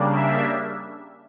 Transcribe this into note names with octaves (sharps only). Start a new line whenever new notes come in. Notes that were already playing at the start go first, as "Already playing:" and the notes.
Already playing: C#3 G3 A#3 D4
E5